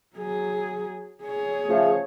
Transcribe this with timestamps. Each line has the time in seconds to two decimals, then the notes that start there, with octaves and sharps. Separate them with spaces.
0.16 F#3 G#4
1.23 G#4 C#5
1.67 C#3 F3 A3